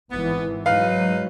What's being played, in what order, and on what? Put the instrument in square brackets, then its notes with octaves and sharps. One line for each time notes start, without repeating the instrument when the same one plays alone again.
[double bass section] G#1 E3 [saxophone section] B3
[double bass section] G#2 F#3 [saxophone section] D#4 B4 [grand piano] F5